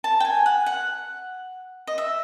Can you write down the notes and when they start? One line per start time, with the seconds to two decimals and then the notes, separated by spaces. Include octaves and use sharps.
0.04 A5
0.20 G5
0.25 G#5
0.46 F#5
0.66 F#5
1.87 D#5
1.98 E5